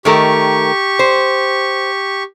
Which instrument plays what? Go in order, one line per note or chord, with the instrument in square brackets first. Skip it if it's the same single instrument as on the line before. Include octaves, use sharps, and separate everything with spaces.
[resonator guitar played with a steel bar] D#3 A3 A#4 [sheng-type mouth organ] G4 C#6
[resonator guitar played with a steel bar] C5